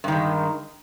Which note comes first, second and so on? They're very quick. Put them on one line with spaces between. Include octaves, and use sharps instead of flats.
G2 D#3 G#3